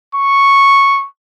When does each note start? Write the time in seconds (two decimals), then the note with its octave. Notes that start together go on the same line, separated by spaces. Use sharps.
0.15 C#6